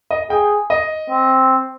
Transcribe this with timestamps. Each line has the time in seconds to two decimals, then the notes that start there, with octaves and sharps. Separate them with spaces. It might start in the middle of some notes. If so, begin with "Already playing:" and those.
0.11 D#5
0.30 G#4 G5
0.70 D#5
1.10 C4